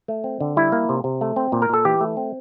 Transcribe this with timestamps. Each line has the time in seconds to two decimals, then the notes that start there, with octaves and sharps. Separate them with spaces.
0.08 A3
0.24 C4
0.40 D3
0.56 G3 E4
0.72 A#3
0.89 C3
1.04 C3
1.21 A3
1.36 C4
1.52 A#2
1.62 A#4
1.69 A#2 A4
1.85 E3 G4
2.01 A3
2.17 C4